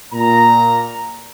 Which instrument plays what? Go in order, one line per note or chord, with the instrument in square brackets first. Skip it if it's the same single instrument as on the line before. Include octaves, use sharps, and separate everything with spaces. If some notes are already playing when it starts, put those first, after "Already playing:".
[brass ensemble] A#2 A#5